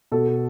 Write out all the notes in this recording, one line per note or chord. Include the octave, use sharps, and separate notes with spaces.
B2 A4